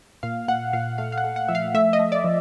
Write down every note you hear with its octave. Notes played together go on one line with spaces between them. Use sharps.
A#2 F5
A#2 F#5
A#2 F5
A3 F5
F5
F#5
A3
F#5
F3 E5
F5
A3 E5
D#5
A3
D5
F3